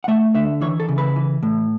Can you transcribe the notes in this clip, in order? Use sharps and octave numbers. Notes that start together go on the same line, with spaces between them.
F#5
A3 E5
D3 E5
E3 C#5
A4
C#3
B4
E3
A2